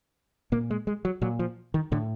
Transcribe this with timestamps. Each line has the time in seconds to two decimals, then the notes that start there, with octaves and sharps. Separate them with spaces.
0.52 A#2 A#3
0.70 G#3
0.87 G#3
1.05 F#3
1.22 A#2 F#3
1.39 F3
1.74 D#3
1.92 A2 D3